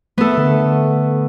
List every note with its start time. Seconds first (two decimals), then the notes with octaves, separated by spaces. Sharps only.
0.18 A3 B3 A4
0.37 D3 A3